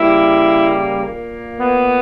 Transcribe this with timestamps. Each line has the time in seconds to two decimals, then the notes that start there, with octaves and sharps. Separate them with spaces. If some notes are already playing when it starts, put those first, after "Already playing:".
Already playing: C#3 G3 A#3 E4
1.03 A#2 A#3
1.58 B3